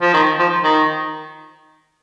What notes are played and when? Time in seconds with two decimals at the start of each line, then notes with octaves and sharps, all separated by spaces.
0.01 F3
0.13 D#3
0.39 F3
0.64 D#3